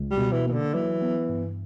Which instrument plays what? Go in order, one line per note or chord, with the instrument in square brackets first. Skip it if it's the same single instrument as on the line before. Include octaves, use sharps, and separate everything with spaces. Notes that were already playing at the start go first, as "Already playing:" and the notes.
Already playing: [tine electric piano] C#2
[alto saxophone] G3
[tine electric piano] B2
[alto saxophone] E3
[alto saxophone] E3 [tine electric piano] A#3
[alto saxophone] D3
[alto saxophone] E3 [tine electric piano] F#3
[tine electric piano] B3
G2